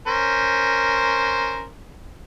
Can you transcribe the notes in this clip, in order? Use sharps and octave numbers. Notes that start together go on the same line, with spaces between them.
C#4 A#4 C5